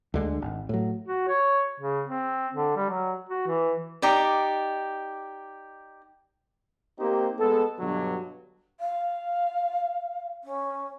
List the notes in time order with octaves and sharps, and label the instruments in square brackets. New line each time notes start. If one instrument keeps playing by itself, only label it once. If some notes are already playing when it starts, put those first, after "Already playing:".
[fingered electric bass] D2 D3 G#3
G#1
A2 F#3
[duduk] F#4
C#5
C#3
C4
D3
G3
F#3
F#4
E3
[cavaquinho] D#4 G4 D5
[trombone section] A#3 C4 D#4 G4 C5
G#3 B3 A4
G2 B2 D3 F#3
[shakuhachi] F5
C#4